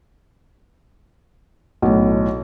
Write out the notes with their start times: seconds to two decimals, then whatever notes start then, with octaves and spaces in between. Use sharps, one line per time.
1.82 B1 A2